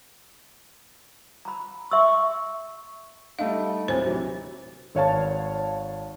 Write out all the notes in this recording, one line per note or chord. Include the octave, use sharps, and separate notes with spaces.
A#5 B5
E5 C6 C#6 E6
G3 A3 D#4 F5
D#2 A2 F#3 C4 C5
C3 E3 F#3
G#1 C#5 F5 A5